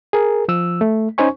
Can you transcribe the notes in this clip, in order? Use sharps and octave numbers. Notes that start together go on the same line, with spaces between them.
G#4 A#4
F3 E6
A3
C#4 D#4 C5 G#5 C#6